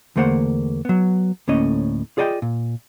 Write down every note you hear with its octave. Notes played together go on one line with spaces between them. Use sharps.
E2 D3 A3 A#3 C5 F#5
F#3 B3
D2 A2 A#3 C#4 D#5
F4 G#4 D5 D#5 F5 G5
A#2